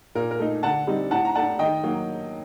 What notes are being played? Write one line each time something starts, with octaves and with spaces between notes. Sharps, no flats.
A#2 A#4
A#4
A3 D#4
D3 F#5 A5
G3 C4 D#4
A2 F#5 A5
A#5
A3 D4 F#5 A5
D#3 D#5 G5
F#3 A#3